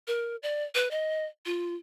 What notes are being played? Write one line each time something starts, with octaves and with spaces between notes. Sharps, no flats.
A#4
D5
B4
D#5
F4